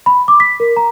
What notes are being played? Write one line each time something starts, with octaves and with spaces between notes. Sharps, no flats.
B5
D6
B6
A#4
A#5